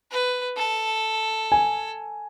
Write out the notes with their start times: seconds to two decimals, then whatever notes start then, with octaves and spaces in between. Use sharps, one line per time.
0.11 B4
0.57 A4
1.52 G#5